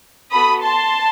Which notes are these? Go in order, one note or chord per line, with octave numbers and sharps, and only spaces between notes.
B3 F#4 A4 B5 D#6
A5 C6